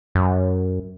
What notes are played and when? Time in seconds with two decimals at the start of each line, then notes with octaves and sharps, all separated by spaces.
0.15 F#2